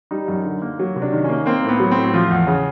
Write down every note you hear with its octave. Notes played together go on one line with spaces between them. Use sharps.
G3 D#4
F#2
D3
A#3
F#3
C3
D4
D#3
A#3 C#4
A#3 C4
A2 B3
F#3
C4
A2
F3 F4
E2
C#3